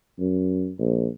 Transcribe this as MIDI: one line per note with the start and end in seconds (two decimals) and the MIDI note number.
0.19 0.72 42
0.79 1.07 34